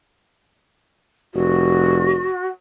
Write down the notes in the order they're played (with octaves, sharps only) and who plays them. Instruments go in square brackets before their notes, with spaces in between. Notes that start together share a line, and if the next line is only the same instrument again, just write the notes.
[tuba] F1 [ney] F#4